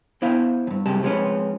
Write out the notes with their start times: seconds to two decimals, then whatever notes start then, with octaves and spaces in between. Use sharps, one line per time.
0.22 B3 E4 C5 E5 F5
0.67 E2 G2
0.86 C2 F#2 C3 G3 G#3 A5
1.03 F3 G#3 C4 C#4 B4